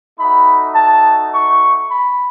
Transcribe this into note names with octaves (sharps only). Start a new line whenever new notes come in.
A3 D#4 F#4 B5
A5
C#6
B5